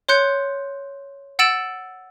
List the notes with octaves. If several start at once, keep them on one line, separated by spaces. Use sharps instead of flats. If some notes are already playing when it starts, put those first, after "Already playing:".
C#5 C6 F#6 G6 C#7
F#5 E6 A6 D7 E7 F#7